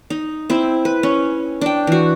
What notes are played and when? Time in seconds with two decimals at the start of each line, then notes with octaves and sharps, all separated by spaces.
0.10 D#4
0.50 C4 E4
0.85 B4
1.03 C#4
1.61 D4 G5
1.87 E3 F#4